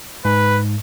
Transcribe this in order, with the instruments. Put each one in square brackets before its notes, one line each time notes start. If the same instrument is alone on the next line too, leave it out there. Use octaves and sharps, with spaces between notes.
[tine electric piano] G#2 [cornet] B4